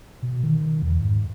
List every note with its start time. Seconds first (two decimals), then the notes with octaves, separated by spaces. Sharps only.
0.23 B2
0.43 D#3
0.82 E2
1.01 G#2